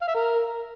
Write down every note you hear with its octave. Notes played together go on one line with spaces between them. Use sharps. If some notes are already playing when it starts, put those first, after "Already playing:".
F5
E5
A#4